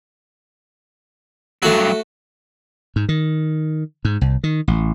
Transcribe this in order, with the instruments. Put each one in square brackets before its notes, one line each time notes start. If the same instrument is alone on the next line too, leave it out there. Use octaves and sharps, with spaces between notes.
[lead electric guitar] G2 F#3 [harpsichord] A3 F#4
[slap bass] G#2
D#3
G#2
C2
D#3
A1